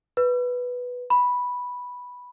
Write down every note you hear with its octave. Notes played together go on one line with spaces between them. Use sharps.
B4
B5